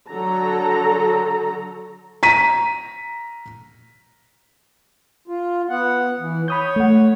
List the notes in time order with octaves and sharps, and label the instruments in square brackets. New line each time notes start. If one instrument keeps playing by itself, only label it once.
[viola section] D3 F#3 A4 A#5
[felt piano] A#5 B6 D#7
[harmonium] F4
B3 F#5
E3
[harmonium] C#5 [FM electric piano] B5 D#6 G6
[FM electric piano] A3 F#5